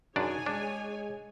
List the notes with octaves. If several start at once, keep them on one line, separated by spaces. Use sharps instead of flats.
F#2 D4 D#4 G#4 C#5 D5 G#5
G#3 D4